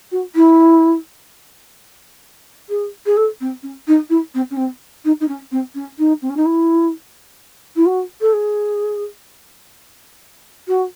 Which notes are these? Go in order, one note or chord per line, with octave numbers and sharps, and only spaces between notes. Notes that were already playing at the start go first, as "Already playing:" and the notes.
F#4
E4
G#4
G#4
A4
C4
C#4
D#4
E4
C4
C#4
C4
D#4
D#4
C#4
C4
C#4
D#4
C4
C#4
D#4
E4
E4
F#4
A4
G#4
F#4